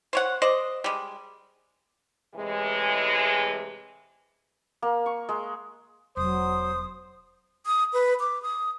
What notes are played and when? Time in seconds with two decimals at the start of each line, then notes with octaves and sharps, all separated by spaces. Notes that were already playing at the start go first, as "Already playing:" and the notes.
0.13 C5 C#5 F#5
0.42 C5 D5 D#5
0.84 G3 G#3
2.35 A2 C3 E3 G#3
4.82 A#3
5.06 C#6
5.29 G#3
6.17 E1 F#3 C5 D#6
7.66 D#6
7.93 B4
8.20 D6
8.42 D#6